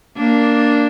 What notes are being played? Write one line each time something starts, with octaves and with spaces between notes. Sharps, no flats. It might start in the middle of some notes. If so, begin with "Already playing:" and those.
A#3 D4